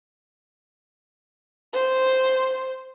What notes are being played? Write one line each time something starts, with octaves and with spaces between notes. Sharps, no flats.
C5